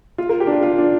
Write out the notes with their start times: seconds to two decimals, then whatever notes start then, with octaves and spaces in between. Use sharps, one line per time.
0.18 F4
0.29 A#4
0.40 G4
0.47 D4
0.52 F4
0.63 F4
0.78 D4